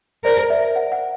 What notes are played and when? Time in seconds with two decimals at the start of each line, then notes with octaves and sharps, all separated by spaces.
0.24 A#4 C5 D5
0.50 D5 E5
0.76 F#5
0.92 F#5